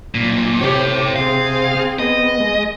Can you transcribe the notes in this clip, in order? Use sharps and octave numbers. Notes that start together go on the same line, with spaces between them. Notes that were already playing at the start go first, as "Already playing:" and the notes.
B1 A#2
C3 G4 A4 C#5
C4 G#4 F5
B3 D#5
G#3